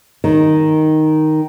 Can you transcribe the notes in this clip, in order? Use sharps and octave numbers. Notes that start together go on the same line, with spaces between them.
D#3